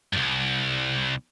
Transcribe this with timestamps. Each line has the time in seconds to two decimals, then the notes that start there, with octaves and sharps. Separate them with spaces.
0.13 C2 G2